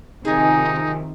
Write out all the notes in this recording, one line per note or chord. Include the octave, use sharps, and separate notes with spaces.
C3 D#3 F3 D#4 G#4 G#5